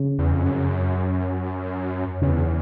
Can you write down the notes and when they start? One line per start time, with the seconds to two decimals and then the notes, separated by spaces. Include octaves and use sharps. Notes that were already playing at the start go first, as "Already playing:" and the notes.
Already playing: C#3
0.19 E2
0.31 F2
0.45 F#2
2.22 E2 C#3